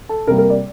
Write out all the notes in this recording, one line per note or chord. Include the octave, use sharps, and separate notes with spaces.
A4
C3 G3 A#3 A#4
A#4
D5